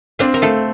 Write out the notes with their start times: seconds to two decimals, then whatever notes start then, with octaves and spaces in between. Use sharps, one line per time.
0.19 C4 D4 F4
0.34 A#4
0.42 A3 F4 A4